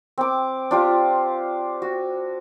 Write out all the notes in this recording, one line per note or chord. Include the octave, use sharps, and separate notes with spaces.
C4 D6
D4 F4 G4
F#4